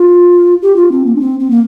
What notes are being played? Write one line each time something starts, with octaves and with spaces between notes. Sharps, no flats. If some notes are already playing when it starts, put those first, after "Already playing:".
Already playing: F4
G4
F4
C4
A#3
D4
C4
C4
A#3